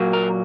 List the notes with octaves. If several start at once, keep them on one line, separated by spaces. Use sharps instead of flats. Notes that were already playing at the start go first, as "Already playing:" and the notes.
Already playing: A#2 F#3 A#3
A#4